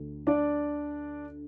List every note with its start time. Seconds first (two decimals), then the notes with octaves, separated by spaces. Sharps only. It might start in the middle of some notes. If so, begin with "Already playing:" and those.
Already playing: D2 D3
0.27 D4 D5